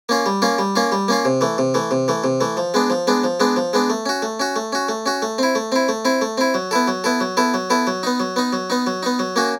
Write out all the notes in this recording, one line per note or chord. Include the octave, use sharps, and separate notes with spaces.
A#3 C#4 F4
G3
A#3 C#4 F4
G3
A#3 C#4 F4
G3
A#3 C#4 F4
C3
E3 A3
C3
E3 A3
C3
E3 A3
C3
E3 A3
F3
G#3 B3 D4
F3
G#3 B3 D4
F3
G#3 B3 D4
F3
G#3 B3 D4
A3
C#4 F#4
A3
C#4 F#4
A3
C#4 F#4
A3
C#4 F#4
A3
C4 E4
A3
C4 E4
A3
C4 E4
A3
C4 E4
F#3
B3 E4 A4
F#3
B3 E4 A4
F#3
B3 E4 A4
F#3
B3 E4 A4
F#3
B3 D#4
F#3
B3 D#4
F#3
B3 D#4
F#3
B3 D#4
F#3
A#3 C#4 F#4